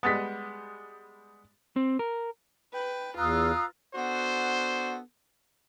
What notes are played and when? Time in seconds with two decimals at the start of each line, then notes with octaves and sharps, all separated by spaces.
0.03 G3 G#3 B3 D#6 A6 B6
1.76 C4
1.99 A#4
2.74 B4 G5
3.18 E2 F4 F5 A#5 D#6 E6 F#6
3.95 B3 D4 F#4 A4 C5